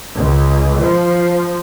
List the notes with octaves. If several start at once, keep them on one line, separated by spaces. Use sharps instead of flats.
C#2
F3